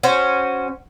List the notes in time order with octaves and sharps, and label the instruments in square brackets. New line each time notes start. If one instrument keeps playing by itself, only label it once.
[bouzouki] C#4 F#4 C5